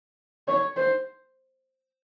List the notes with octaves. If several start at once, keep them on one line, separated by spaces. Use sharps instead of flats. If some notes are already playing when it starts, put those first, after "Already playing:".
C#5
C5